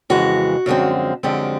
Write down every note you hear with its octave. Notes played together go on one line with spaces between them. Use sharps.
F2 C#3 E3 G#3 F#4
F#2 D3 F3 G#3 C4
F#2 D3 F3 G#3 C4 G4